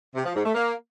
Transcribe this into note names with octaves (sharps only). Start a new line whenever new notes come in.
C3
F3
G#2
A3
A#3